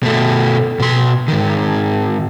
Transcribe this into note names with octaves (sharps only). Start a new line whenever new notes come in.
B2 A3
B2 C6
G#2 D#3